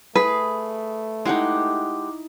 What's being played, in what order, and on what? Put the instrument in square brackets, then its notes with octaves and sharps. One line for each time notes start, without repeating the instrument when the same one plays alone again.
[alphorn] A3 [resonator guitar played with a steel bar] G#4 [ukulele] B4
[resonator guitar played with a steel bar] G#3 G4 F#5 [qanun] D#4 E4